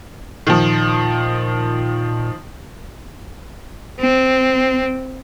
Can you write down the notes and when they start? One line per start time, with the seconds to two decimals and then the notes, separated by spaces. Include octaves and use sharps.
0.47 A#2 D#3 F3
4.01 C4